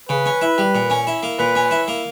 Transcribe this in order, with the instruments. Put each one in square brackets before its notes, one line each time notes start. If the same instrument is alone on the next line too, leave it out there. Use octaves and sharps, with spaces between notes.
[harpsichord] C#3 [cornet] B4
[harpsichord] C#4
E4
G3
A#2
C#4
E4
A#3
[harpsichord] A#2 [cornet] B4
[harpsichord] C#4
E4
A#3